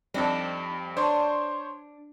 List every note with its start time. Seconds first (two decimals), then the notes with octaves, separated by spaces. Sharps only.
0.14 F2 G3 C4 D4 D#4
0.97 D4 C5 C#5 C6